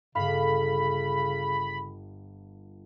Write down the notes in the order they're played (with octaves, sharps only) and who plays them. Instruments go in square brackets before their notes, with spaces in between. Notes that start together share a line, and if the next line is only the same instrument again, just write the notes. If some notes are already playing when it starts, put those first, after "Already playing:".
[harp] G1 G2 F5 [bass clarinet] C#3 [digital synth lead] B5